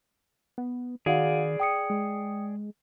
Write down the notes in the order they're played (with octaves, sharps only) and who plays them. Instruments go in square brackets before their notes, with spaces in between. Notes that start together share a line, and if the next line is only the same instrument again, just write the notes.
[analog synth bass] B3
[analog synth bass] D#3 [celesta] F#4 F5 F#5 [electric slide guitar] G#4 D5
[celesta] G5 D#6 C#7
[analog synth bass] G#3